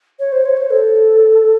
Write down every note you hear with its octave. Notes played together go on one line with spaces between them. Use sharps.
C#5
C5
C#5
C5
A4